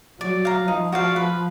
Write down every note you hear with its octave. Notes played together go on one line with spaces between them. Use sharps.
F#3 D5
F5 A#5
F3 D#4
F#4 D5 F5
B4